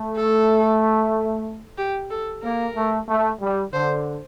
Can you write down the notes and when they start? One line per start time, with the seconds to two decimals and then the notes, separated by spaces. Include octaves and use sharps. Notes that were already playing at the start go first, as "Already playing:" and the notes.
Already playing: A3
0.16 A4
1.78 G4
2.10 A4
2.43 A#3 A#4
2.76 A3
3.08 A3
3.41 G3
3.72 D3 C5